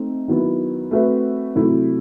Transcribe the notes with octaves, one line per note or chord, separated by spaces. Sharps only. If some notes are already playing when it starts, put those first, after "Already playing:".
Already playing: A3 C4 D#4
D#3 F#3 B3 E4
A3 C4 F#4 B4 E5
C3 F#3 A3 E4